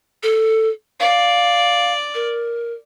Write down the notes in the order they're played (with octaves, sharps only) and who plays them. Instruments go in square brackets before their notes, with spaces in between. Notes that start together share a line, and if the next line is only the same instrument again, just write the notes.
[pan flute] A4
[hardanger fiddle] D5 [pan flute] F5
[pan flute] A#4